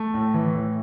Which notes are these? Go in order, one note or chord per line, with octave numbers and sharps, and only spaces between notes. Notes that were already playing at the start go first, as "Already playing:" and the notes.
Already playing: A3
A2
E3
A2